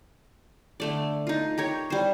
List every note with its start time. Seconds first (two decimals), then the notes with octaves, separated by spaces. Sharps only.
0.80 D3 A3 D5
1.27 D#4 F4
1.58 G4 A#4 C#5
1.90 G3 C5